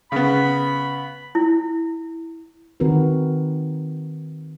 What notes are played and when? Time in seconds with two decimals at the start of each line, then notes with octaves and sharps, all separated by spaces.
0.12 C#3 B3 B5
1.35 E4
2.80 D#3 C4 F#4 A#4 B4